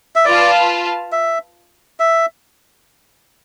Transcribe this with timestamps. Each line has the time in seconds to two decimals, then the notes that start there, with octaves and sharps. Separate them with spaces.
0.16 E5
0.25 F4 B4 D5 F5 A5
1.12 E5
2.00 E5